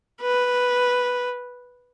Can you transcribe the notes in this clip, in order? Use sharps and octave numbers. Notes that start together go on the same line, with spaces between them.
B4